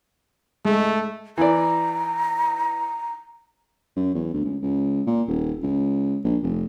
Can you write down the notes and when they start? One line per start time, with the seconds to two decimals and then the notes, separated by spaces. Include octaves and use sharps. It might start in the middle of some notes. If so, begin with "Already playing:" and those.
0.65 G#3 A3
1.38 E3 D5 A#5
3.96 F#2
4.15 E2
4.33 D2
4.45 C#2
4.63 C#2
5.07 A#2
5.28 D#1
5.63 C#2
6.24 A#1
6.43 F1